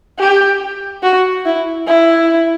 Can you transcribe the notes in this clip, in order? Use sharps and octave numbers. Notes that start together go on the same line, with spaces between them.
G4
F#4
E4
E4